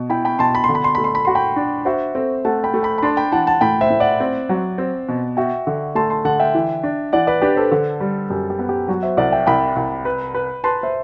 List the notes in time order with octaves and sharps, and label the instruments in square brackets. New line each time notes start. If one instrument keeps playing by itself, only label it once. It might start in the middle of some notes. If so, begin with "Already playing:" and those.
Already playing: [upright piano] B2
[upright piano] E4 [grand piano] G5 B5
[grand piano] G5 B5
[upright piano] B2 [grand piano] A5 C6
[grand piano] B5
C6
[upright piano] D3
[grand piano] B5
C6
[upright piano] A3 [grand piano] B5
[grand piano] C6
B5
[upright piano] F#4 [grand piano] C6
[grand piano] G5 B5
[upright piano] D4
[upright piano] F#4 [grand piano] C5 E5
[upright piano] C4 [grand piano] A4 C5
[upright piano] A3 [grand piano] F#5 A5
[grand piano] G5 B5
[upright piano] A3
[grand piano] G5 B5
B5
[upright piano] D4 [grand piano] A5 C6
[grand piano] G5 B5
[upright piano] E3 [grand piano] F#5 A5
[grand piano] F#5 A5
[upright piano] A2 [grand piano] G5 B5
[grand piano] C5 E5
[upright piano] A2
[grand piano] D5 F#5
[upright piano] C4
F#3
C4
B2
[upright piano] F#4 [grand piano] E5 G5
[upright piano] D3
[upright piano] A3 [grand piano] A5 C6
[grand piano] A5 C6
[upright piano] D3 [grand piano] F#5 A5
[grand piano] E5 G5
[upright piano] E3
D4
[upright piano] E3 [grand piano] D5 F#5
[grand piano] B4 D5
[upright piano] D4 [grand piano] G4 B4
[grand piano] A4 C5
[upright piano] D3
G3
[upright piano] F#2 [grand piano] G4
[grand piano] G4
[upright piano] B3
[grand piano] G4
[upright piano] F#3 [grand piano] F#4
[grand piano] C5 E5
[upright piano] C2 [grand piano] D5 F#5
[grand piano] E5 G5
[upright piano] C2 [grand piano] G5 B5
[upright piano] C2
B4
B4
[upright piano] B4 [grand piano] A5 C6
[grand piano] C5 E5